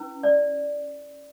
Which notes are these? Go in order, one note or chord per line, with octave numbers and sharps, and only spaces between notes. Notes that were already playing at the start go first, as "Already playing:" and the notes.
Already playing: C#4 E4 B4
D5